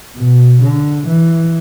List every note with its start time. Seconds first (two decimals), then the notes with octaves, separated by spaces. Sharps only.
0.16 B2
0.62 D3
1.08 E3